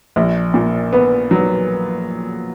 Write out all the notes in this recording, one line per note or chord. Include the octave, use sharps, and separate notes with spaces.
A#1
A#2
B3
F#3